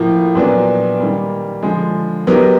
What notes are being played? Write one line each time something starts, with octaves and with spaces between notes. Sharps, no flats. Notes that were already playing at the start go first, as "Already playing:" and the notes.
Already playing: A2 F3 A#3
A#2 F#3 B3 D4
D#3 G3 A#3
D3 F3 G#3
F#3 B3 D#4 G4 A#4